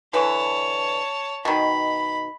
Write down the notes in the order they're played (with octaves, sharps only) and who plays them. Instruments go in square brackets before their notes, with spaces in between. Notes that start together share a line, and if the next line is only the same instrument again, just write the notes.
[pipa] D3 E3 B4 [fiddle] C#5 A5
[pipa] B2 D#3 [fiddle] B5